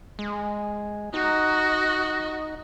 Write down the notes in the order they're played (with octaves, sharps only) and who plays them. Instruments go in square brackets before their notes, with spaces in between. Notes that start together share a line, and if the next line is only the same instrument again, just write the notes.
[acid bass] G#3
[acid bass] D#4 [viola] F#4 D#5